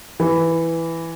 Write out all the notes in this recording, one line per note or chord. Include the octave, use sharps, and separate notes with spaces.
E3